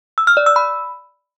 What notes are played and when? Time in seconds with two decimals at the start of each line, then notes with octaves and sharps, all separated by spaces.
0.18 E6
0.27 F6
0.37 D5
0.46 E6
0.56 B5